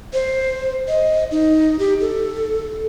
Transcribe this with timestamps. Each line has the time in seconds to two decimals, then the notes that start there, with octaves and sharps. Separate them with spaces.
0.13 C5
0.88 D#5
1.31 D#4
1.79 G4
2.01 A4